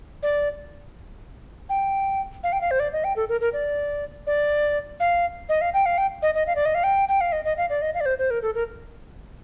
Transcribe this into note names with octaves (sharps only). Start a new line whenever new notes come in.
D5
G5
F5
G5
F5
C5
D5
D#5
G5
A4
A#4
A#4
D5
D5
F5
D#5
F5
G5
F5
G5
D#5
D#5
F5
D5
D#5
F5
G5
G5
F5
D#5
D#5
F5
D5
D#5
F5
D5
C5
C5
A#4
A4
A#4